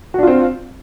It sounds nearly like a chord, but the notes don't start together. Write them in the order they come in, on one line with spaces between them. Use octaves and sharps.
F#4 D4 F4 C4